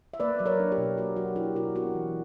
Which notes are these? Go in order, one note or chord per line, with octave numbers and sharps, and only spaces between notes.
E5
A#3 B4 D5
F#3 D5
A#4 C#5
D4
G4 B4
B2
A#3 F#4 A#4
F#3 F#4
D4 E4 G4
B2 F#4 A#4
B3 F#4 A#4
E3